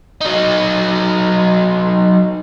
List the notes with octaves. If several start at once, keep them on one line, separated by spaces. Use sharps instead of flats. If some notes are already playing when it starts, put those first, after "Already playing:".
F#3 D#4